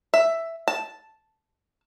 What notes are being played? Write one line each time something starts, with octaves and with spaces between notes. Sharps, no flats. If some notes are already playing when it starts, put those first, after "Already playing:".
E5
A5